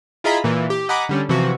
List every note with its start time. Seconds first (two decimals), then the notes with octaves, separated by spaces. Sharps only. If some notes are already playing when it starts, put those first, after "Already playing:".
0.24 E4 F4 G#4 D#5 A#5 B5
0.44 A#2 E3
0.70 G4
0.89 D#5 F#5 G#5 A#5 B5 D6
1.09 D3 G3 C#4
1.29 C3 E3 F3 F#4